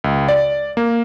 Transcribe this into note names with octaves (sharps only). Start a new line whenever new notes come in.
C#2
D5
A#3